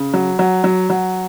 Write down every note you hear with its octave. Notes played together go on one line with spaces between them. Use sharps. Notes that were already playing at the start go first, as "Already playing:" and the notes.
Already playing: C#3
F#3
F#3
F#3
F#3